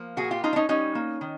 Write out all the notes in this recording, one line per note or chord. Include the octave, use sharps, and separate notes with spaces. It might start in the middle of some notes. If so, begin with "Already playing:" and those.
Already playing: F3 A#3
A#2 F#4 G#4
F4 G4
C#4 D#4 F4
D4
C#4 D#4
G3 C#4 D#4
A#3
D#3